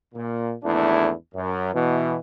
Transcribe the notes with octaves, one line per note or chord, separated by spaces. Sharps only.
A#2
G#1 E2 A3 D4 E4
F#2
B2 E3